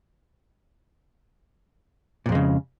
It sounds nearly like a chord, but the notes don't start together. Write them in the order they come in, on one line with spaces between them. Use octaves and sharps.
A#2 F2 G#3 C#3